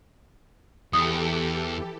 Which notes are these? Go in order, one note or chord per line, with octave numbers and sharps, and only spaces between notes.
E2 E3 G4 A4 D#6